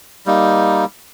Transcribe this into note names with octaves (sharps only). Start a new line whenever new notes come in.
G3 A#3 D#4